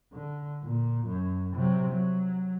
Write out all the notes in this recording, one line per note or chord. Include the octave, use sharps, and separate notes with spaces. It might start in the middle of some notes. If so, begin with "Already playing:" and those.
D3
A#2
F#2
C3 F#3
F#3